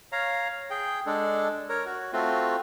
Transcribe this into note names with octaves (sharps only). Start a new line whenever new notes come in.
C#5 F5 A#5
G#4 G5
G#3 D4 A4
A#4 C#5
F#4
A3 C4 F4 F#4